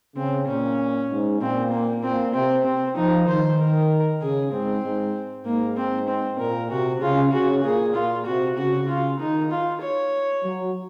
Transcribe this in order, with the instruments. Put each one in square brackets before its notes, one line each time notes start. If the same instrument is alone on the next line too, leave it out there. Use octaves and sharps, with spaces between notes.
[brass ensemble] C#3 [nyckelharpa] C4
[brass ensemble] A#2 [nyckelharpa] C#4
[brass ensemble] G#2
[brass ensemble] A#2 [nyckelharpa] C4
[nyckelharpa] A#3
[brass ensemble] A#2 [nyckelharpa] C4
[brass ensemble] C3 [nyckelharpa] C4
[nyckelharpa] C4
[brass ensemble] F3 [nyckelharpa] D#4
[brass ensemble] D#3 [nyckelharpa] C5
[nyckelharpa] A#4
[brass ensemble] C#3 [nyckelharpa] G#4
[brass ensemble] G#2 [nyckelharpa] C4
[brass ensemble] G#2
[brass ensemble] G#2 [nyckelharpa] A#3
[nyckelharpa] C4
C4
[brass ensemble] A#2 [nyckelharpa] A#4
[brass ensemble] C3 [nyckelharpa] F#4
[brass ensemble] C#3 [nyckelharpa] F4
[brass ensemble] C#3 [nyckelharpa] F#4
[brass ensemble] A#2 [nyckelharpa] G#4
[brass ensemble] A#2 [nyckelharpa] F4
[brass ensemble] C3 [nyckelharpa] F#4
[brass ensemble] C#3 [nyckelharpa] F#4
[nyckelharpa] F4
[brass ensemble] D#3 [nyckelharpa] D#4
[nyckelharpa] F4
C#5
[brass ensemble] F#3